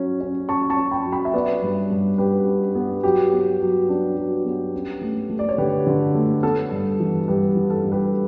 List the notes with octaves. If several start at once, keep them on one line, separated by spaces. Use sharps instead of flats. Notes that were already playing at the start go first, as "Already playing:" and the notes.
Already playing: F#3 C#4
C#4
C#4 A5 C#6
A5 C#6
C#4
G5 B5
F#3
G5 B5
E5
B3 B4 D5
G2
G2
G2 G4 B4
D4
B3
F#3 G4
B3
F#3
D4
F#3
B3
C#4
A3
A3
D5
C#5
D3 G4 B4
D3
A3
B3 A4
G2
E3
G2 G4 B4
E3
A4
G2
G4 B4